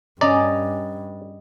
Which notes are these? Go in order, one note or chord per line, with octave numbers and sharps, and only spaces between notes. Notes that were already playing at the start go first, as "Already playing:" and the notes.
G2 C#4 D5 D#5 A#5